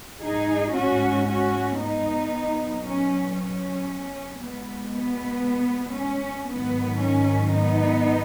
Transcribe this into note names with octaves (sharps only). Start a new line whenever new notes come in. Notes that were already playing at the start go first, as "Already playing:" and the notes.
G#2 G#3 D#4 G#4
C#4 F#4
C#4 F#4
B3 D#4
B2 F#3
C#4
C#4
B2 G#3 B3
B3
C#4
G#2 D#3 F#3 B3
C#4
B3 D#4